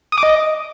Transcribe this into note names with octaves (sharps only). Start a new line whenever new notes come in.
D#6
D6
D#5